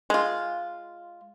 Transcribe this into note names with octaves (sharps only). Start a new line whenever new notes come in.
G#3 F4